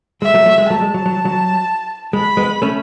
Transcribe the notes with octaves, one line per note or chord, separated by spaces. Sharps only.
G#3 E5
F#3 A3
F#3 A3
G#3
F#3 A3 A5
G#3
F#3
F#3
F#3
G#3 B5
G#3 B3
A3 C#4